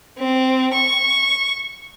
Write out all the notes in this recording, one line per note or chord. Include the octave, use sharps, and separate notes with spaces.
C4
C#6